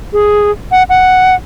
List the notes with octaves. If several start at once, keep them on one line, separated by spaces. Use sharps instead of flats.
G#4
F#5
F#5